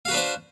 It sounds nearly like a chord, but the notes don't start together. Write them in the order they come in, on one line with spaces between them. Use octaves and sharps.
F5 F#4 B4 D4 C5